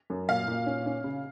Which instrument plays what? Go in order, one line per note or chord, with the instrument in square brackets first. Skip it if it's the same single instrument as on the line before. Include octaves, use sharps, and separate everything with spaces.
[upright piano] F#2
[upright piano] A#2 [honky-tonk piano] F5
[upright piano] A#2
C#4
C#4
C#3